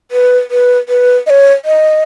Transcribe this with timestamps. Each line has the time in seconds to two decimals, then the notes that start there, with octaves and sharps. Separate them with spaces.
0.11 B4
0.51 B4
0.89 B4
1.27 D#5
1.30 C#5
1.65 D#5